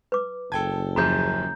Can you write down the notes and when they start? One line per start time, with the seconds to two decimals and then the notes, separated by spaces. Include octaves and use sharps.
0.12 B4 D6
0.52 F#1 A4 G5 A5 G#6
0.96 D#1 F#2 F3 F#4 G#4 A#5 G6